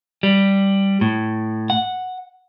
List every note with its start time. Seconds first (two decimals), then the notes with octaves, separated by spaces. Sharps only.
0.23 G3
1.01 A2
1.70 F#5